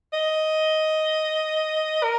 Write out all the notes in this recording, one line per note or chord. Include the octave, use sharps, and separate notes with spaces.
D#5
A#4